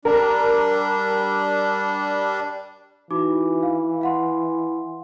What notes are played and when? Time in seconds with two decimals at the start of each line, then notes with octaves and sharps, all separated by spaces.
0.05 G3 D4 A#4
3.11 E3 D#4 F#4 D6
3.63 F5
4.01 F5 F#5 C6